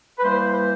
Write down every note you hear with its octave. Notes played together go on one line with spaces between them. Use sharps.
B4
E3 G3 A#3 C5
C5